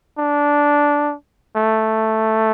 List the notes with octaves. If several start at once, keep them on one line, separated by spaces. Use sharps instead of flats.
D4
A3